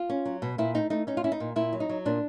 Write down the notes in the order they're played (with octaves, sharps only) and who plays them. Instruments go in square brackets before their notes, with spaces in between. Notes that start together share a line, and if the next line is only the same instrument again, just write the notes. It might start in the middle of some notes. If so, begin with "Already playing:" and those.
Already playing: [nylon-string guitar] F4
C#4
F#3
B2
A#2 E4
A3 D#4
A3 D#4
C#4 D#4
F4
C#4 E4
D#4
A#2
A#2 E4
F#3
D#4
F#3
A#2 D4